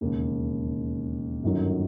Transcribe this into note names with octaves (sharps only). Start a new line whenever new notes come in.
E1 D#2 C#3
G1 F#2 D#3 F#3